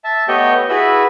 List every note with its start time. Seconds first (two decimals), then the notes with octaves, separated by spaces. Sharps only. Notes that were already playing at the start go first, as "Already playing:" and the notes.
0.04 E5 A5
0.28 A3 B3 G4 C#5 D#5 G5
0.69 E4 F#4 G#4 B4 B5 E6